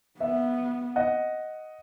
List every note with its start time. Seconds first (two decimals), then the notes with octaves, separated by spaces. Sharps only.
0.20 B3 E5
0.96 D#5 F#5